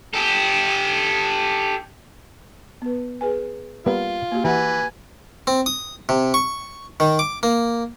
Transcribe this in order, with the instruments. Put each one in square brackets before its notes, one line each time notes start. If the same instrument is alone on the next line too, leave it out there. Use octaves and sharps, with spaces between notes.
[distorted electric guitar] G4 A4
[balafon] B3 B4
G#4 B4 G#5
[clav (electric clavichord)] G3 A#3 B3 [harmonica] F4
[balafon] A#3 F#4 G4
[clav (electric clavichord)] E3 [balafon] G4 F#5 [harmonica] B4 G#5
[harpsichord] C4
D#6
C3
C#6
D#3
D6
A#3